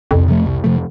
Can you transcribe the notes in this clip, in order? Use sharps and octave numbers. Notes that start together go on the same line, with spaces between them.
C2 F2
C3 F3 A3
C2
C3 F3 A3